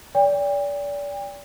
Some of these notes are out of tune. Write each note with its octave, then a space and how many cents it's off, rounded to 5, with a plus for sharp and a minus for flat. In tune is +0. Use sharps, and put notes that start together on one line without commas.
D5 -35 G5 +35